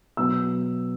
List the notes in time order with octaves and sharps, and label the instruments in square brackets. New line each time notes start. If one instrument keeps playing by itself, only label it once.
[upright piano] B2 F#3 B3 E6